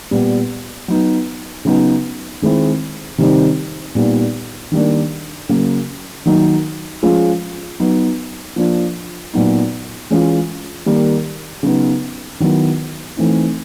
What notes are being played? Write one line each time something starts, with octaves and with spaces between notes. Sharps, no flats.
A#2 G3 B3
F#3 B3 D#4
C#3 F#3 B3 D#4
D#3 G#3 C4 E4
C3 D#3 G3 C4 D#4
A#2 G3 B3 D#4
D#3 G3 A#3 D4
C#3 F#3 A#3
D#3 F#3 A#3 D#4
F3 G#3 C#4 F4
F#3 B3 D#4
F3 A#3 D4 F4
A#2 F#3 B3 D#4
E3 G#3 C#4 F4
D#3 G3 A#3
C#3 F#3 B3 D#4
D#3 F#3 B3 E4
E3 A3 C4 D#4